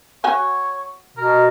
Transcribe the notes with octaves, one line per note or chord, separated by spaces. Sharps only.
F#4 C#5 F#5 G#5
B2 A#4